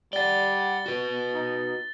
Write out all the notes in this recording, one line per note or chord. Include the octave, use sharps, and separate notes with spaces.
G3 D5 F#5 A6 G7
F#4 B4
D#4